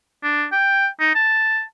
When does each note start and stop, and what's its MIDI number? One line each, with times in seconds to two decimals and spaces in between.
0.23 0.45 62
0.52 0.88 79
1.00 1.11 63
1.15 1.63 81